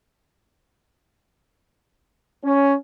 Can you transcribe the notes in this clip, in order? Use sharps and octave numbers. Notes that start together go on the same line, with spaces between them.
C#4